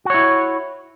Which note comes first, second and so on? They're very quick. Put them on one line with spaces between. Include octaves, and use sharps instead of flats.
F#4 C#5 E4